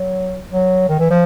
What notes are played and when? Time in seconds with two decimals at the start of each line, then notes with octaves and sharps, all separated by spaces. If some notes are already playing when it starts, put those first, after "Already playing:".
Already playing: F#3
0.51 F#3
0.89 D#3
0.99 E3
1.10 F3